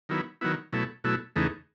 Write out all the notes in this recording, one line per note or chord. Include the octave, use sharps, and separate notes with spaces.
D#3 F#3 B3 E4
D#3 F#3 B3 E4
B2 F#3 A3 E4
B2 F#3 A3 E4
E2 C#3 E3 A3 D#4